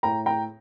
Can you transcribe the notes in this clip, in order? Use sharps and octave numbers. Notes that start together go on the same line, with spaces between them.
A2 G5 A#5
G5 A#5